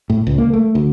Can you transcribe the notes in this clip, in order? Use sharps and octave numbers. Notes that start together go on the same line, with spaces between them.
A2
C#2
A#3
A3
D2